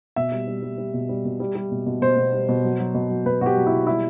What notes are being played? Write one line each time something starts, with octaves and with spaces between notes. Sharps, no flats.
B2 E5
G3
G3
G3
G3
B2
G3
B2
G3
G3
B2
B2
B2 C5
B2
G3
B2
F#3
F#3
B2
F#3
B2 B4
B2 F#4 G4
F#3
E4
B2
G3 E4